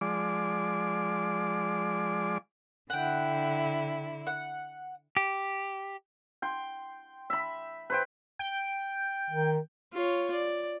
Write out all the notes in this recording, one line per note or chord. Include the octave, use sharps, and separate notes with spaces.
F3 G#3 D5 D6
D3 E4 F#5 G5
F#5
G4
G5 C6
E5 B5
B4 C5 G5
G5
D#3
F4 C#5
D5